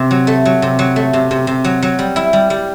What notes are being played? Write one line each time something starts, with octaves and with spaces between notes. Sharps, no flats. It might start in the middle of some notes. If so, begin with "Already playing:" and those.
Already playing: C3
F#3
A3
F#3
C3
F#3
A3
C3
C3
C3
F#3
F#3
G3
E4
G3
G3